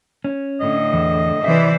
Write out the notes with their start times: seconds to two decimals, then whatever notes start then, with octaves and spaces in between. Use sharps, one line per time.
0.24 C#4
0.61 A2 D3 D#5
0.93 E2
1.44 C3 E3 C5 D5 E5